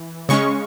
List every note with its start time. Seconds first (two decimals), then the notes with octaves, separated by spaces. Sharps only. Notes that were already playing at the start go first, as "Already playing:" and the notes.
Already playing: E3
0.29 C#3 G#3 C#4 C#6